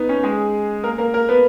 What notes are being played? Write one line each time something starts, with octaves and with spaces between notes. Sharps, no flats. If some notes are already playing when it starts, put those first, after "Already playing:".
Already playing: B3 D#4
C#4
G#3 G#4
A#3 A#4
A#3 A#4
A#3 A#4
B3 B4